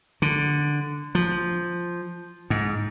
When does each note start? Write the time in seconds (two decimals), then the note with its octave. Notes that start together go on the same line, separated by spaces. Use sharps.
0.22 D3
1.15 F3
2.50 G#2